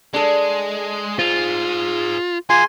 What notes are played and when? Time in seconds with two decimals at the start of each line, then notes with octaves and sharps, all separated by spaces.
0.14 G#3 D4 A4
1.19 F4 G#4 C5
2.50 F4 G#4 E5 G#5 C6